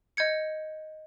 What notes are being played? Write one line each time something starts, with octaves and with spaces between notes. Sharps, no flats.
D#5 G6 G#6 C#7